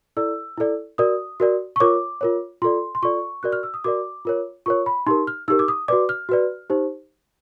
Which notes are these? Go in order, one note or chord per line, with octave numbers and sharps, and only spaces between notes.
E4 A4 D5 E6
E4 A4 D5
F#4 A#4 D5 D#6
F#4 A#4 D5
C#6
F4 A#4 C#5 D6
F4 A#4 C#5
F4 A4 D5 C6
C6
F4 A4 D5 C#6
F#4 A#4 D5 F#6
F6
E6
D#6
F#4 A#4 D5 D6
F4 A#4 C#5
F4 A#4 C#5 C#6
B5
D#4 G4 A#4 C6
F6
D#4 G4 A#4 E6
D6
D#6
F#4 B4 D5 D6
F6
F#4 B4 D5
D#4 G4 C5